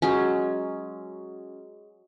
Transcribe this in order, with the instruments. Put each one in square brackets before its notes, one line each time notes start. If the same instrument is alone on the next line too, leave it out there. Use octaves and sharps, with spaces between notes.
[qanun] F#3 G#3 C#4